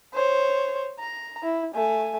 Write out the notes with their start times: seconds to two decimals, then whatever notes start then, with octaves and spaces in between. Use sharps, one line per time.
0.14 C5 C#5
0.99 A#5
1.43 E4
1.75 A3 G#5